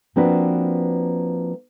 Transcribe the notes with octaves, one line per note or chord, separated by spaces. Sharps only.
F3 A#3 C4 D4 F#4 B4